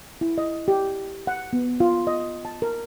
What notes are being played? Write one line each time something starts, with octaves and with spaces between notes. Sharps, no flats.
E4
D#5
G4
F#5
B3
F4
D#5
A5
A#4